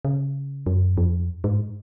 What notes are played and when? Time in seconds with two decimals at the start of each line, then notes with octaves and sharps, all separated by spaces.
0.05 C#3
0.66 F#2
0.97 F2
1.44 G#2